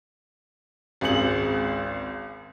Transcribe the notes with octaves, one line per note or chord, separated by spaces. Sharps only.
G#1 C#2 C4 G#4 C#7 F#7